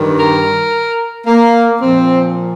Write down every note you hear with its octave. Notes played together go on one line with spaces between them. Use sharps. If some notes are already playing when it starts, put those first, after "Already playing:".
Already playing: G2 D#3
A#4
A#3
A#2 F3 C4